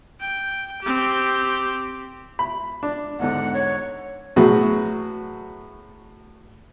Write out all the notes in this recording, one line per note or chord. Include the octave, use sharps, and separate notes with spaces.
G5
C4 G4
B5
D4
E2 G#2 D3 F#5
C#5
A2 F#3 B3 F#4 G#4